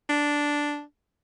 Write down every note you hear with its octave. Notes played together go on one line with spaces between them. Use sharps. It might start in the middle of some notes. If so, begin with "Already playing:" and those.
D4